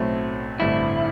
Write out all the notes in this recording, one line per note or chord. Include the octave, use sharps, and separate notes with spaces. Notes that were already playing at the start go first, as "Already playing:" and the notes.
Already playing: B1 A2 F#3 A3 C4
A1 G2 D3 A3 C4 E4